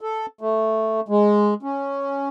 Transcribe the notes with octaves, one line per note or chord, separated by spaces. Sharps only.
A4
A3
G#3
C#4